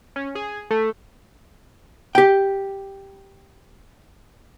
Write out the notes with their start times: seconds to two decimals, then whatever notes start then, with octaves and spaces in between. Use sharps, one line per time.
0.16 C#4
0.35 G#4
0.71 A3
2.15 G4 G5